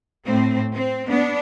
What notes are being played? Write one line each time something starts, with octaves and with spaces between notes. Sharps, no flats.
A2 C4
C4
B3 D4